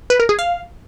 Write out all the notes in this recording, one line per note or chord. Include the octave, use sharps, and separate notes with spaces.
B4
A#4
G#4
F5